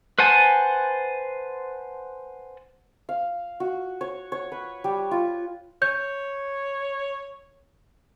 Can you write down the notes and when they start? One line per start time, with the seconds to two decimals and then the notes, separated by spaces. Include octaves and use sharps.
0.19 B4 C5 F#5 G#5 A5
3.09 F5
3.60 F#4
4.01 C#5
4.32 C#5
4.52 B4
4.84 G3
5.11 F4
5.82 C#5 G6